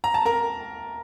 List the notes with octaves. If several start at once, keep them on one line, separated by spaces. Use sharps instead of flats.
A#5
A5
A#4 A#5